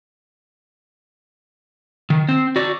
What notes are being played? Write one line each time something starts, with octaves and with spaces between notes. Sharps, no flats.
D#3
C4
F#4 D5